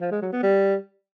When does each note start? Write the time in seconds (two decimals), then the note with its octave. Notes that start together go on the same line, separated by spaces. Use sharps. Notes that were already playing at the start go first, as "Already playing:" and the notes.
0.01 F3
0.11 G#3
0.22 F#3
0.32 B3
0.43 G3